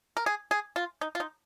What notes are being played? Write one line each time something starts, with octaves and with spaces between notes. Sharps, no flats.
A#4
G#4
G#4
F4
D#4
F4
D#4